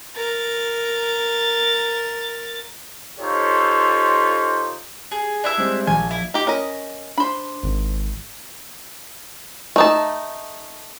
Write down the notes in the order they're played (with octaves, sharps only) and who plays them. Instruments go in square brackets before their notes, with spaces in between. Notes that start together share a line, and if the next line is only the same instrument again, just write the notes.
[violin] A#4 A6
[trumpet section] D#4 F4 G4 A4 C5 C#5
[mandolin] G#4
D4 E4 E5
[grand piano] G3 G#3 C4
[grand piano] A#1 [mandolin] G#5
[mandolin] E4
[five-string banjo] D#4 G4
C#4 A#4 D#5
[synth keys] D4 [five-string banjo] C5 B5
[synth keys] G#1
[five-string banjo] A3 D#4 A5